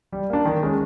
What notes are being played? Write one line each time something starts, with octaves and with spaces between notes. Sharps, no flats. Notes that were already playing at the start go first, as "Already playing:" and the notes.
G3
A#3 D4
D#3
G#3 C#4